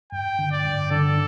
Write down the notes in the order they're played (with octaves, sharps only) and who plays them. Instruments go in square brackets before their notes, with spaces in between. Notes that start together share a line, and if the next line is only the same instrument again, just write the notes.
[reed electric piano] G2 [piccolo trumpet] G5
[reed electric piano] D3
[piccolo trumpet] D5
[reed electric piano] G2
[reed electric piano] D3 [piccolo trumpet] A4